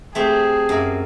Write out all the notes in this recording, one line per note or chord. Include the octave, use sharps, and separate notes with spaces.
A3 C4 G4 G#4
F#2 A#3